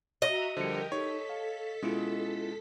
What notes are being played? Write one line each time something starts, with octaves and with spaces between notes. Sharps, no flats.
F#4 D#5 E5 A#5
D3 F3 G3 G4 A#4 C5 G5 C#7
D#4 A4 C#5 B6
F5
B2 G#3 C#4 E4 F4